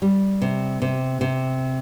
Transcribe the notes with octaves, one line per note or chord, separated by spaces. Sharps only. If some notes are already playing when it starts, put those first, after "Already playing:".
G3
C3
C3
C3